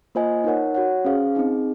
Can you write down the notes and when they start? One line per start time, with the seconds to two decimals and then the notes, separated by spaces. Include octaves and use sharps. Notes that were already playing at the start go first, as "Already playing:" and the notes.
0.15 A#3 F4 C5 D#5 G#5
0.44 D#4 A#4 C#5 F#5
0.75 F#4 C#5 F#5
1.05 C#4 G#4 C5 F5
1.35 C4 D#4 G#4